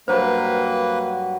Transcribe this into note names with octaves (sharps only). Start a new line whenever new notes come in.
G2 F#3 A#3 B4 C5 G5